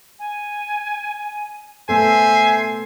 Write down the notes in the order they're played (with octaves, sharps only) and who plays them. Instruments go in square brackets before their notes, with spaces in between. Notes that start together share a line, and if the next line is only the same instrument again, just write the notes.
[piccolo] G#5
[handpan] A3 B3 A4 [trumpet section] C5 E5 G#5 [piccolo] C7